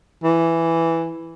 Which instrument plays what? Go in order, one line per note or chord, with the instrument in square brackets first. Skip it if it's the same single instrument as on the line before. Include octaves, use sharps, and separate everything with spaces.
[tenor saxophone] E3